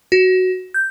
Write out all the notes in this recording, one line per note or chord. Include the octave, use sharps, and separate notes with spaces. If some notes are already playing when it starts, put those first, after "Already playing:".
F#4
G6